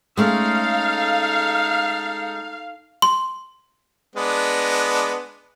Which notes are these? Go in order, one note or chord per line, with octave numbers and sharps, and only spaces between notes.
G#3 A3 C#4 D#4 A4 F5
C6
G#3 B3 D4